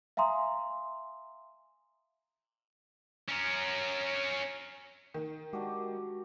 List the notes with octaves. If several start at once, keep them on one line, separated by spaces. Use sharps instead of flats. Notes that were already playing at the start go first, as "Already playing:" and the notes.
E5 F5 G#5 A#5 C6 D#6
C#4 A#4
D#3
G#3 D4 F#4 G4